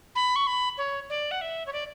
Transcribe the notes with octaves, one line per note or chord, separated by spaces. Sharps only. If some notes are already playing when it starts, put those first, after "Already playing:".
B5
C#6
B5
C#5
D5
F#5
E5
C#5
D5